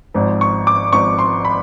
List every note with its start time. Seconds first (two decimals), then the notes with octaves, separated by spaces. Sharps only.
0.14 G#1 G#2 F3
0.41 C#6
0.67 D6
0.93 G#1 G#2 F3 C#6
1.19 C6
1.45 B5